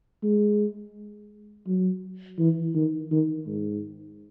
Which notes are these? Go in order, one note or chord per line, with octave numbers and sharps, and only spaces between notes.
G#3
F#3
E3
D#3
D#3
G#2